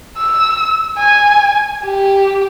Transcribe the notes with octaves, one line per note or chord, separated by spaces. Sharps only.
E6
G#5
G4